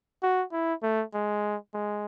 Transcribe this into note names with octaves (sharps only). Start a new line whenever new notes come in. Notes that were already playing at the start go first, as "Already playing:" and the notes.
F#4
E4
A3
G#3
G#3